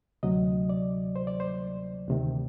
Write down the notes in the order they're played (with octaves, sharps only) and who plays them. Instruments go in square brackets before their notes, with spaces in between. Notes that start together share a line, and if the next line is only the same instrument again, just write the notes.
[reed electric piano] D2 C3 F#3 D#5
D5
C5
D5
C5
D2 C3 D#3